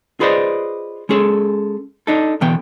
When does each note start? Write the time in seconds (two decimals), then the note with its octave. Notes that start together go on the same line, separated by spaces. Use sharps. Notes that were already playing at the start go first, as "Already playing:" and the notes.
0.20 F4 G#4 B4 C5 D5 D#5
1.09 G#3 C#4 G#4 A4
2.07 D4 D#4 A4
2.41 B2 D3 E3 B3 G5